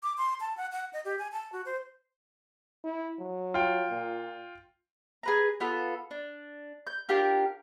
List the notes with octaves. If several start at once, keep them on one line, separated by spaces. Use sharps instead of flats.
D6
C6
A5
F#5
F#5
D#5
G4
G#5
A5
F#4
C5
E4
F#3
F4 G5
A#2
G#4 B4 A#5
B3 F4 A4
D4
G6
D4 F4 G4 A#4